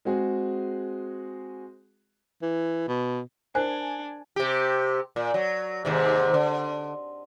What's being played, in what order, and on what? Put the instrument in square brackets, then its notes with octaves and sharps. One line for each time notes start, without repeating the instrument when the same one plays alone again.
[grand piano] G#3 C4 F#4 G#4
[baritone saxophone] E3
B2
[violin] D4 [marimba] A#4 C5 F#6 [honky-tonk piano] G#5
[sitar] C3 G4
A#2
F#3
D#2 G#2 C3
D3